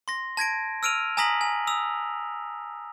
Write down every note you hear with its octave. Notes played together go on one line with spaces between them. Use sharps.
C6 A#6
A5 G#6 A#6 D7
E6 F6 D7 D#7 F7
G#5 A#5 D#6 A#6 B6 F#7
G#5
D#6 E6 F7